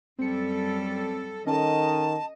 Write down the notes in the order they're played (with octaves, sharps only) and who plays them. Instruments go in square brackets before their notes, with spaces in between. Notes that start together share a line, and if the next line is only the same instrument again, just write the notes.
[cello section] F#2 G3 A4 [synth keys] C4 C#7
[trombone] D#3 [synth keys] C#4 A4 [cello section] D#5 [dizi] A5